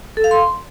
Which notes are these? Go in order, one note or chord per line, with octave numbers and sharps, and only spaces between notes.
A4
F5
C6